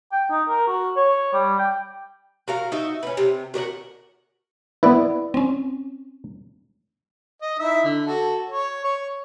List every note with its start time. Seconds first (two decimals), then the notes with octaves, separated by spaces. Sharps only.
0.12 G5
0.30 D#4
0.48 A#4
0.68 F#4
0.96 C#5
1.33 G3
1.59 G5
2.48 F#4 A#4 F5
2.72 D#4 F#4 E5
3.03 C#4 B4
3.17 C3
3.54 F#4 A#4 D5 F#5
4.83 B3 E4 B4 D5
5.34 C4 C#4
7.42 D#5
7.59 D#4 E4 E5
7.84 D3
8.06 F#4 A4
8.50 C#5
8.84 C#5